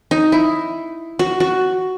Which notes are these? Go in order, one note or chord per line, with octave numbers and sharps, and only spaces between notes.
D#4
E4
F#4
F#4